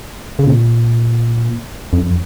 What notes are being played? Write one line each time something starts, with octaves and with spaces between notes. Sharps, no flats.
C#3
A#2
F2